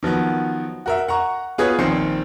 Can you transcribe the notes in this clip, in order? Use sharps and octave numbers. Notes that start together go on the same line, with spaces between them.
D#3 F3 F#3 B3
F#4 A#4 E5
F#5 A#5 C#6
B3 F4 F#4 G#4 B4 C#5
A#1 D#3 C4 C5 C7 C#7